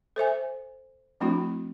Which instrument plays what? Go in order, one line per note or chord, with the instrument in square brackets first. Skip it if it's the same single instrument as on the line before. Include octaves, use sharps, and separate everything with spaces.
[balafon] A4 C5 E5 G#5
F3 A3 C4 D4 E4 F#4